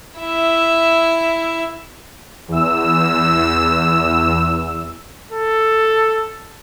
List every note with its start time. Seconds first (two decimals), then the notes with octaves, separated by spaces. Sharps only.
0.20 E4 E5
2.48 E2 E6
5.32 A4